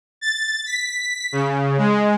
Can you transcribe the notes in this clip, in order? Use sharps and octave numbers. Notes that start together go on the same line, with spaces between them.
A6
B6
C#3
G#3